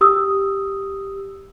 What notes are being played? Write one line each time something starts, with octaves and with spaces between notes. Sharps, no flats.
G4 D#6 E6